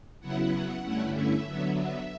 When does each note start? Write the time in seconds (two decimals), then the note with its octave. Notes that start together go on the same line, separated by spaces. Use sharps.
0.20 C#3 F#3 B3 E4 F#5
0.82 G2 D3 A3 C#4 E4
1.14 E5
1.45 D3 F#3 B3
1.75 E5